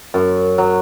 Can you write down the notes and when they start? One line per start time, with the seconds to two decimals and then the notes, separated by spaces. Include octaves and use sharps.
0.14 F#2
0.58 F#3